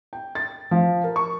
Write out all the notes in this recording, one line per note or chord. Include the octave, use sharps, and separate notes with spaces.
G5
A6
F3
A#4
C#6